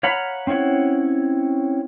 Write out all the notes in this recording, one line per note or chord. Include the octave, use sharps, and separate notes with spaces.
C#5 F5 F#5 A#5 B5
C4 C#4 E4 C#5 F#5